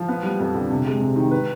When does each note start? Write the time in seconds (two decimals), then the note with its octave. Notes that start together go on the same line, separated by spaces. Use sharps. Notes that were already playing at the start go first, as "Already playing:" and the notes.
Already playing: F3
0.08 B3
0.23 G3
0.39 F2
0.54 D3
0.70 C3
0.85 G#3
1.00 C3
1.16 D#3
1.31 B4